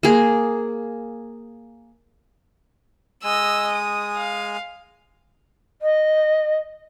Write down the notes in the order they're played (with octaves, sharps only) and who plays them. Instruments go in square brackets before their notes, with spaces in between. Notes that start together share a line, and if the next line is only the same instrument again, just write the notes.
[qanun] A#3 G#4
[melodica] G#3 G#5 [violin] D#5 E6
[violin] D#6
F5
[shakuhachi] D#5